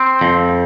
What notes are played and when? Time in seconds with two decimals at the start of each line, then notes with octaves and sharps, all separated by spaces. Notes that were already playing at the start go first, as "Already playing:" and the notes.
Already playing: C4
0.21 F2